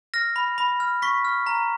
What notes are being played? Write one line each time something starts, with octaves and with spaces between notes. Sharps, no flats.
F6 A#6
B5
B5
F6
C#6 B6
F6
A#5